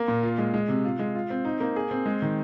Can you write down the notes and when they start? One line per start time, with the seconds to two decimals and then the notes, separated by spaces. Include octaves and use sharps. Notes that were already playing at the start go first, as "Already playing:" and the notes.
Already playing: A#3
0.08 A#2
0.23 F4
0.38 G#3
0.54 G#3
0.68 C3
0.84 F4
0.99 G#3
1.15 F4
1.30 C4
1.45 D#4
1.60 A#3
1.76 G#4
1.91 C4
2.06 G#3
2.22 D#3